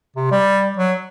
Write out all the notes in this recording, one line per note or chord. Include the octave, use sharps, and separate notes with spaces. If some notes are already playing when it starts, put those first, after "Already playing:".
C3
G3
F#3